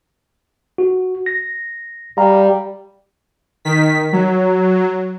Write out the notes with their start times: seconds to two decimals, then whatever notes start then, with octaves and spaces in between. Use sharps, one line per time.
0.78 F#4
1.26 A#6
2.18 G3 F5 A#5
3.65 D#3 B6
4.13 F#3